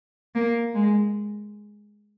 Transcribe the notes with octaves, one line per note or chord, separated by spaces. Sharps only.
A#3
G#3